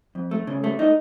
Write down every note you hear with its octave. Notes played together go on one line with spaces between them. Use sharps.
F2
A3
C#3
A3
D#4